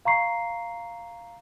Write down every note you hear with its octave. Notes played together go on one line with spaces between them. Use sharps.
F5 A#5 C#6 C7